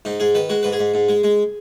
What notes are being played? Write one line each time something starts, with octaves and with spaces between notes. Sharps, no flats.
G#2 D#4
G#2 G#4
D#3 B4
G#3 F#4
G#2 B4
G#4
G#2
G#2
G#3
G#3